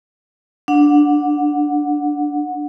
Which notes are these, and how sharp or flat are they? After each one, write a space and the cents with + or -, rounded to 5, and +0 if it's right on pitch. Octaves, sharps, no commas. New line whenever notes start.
D4 +0 F#5 -15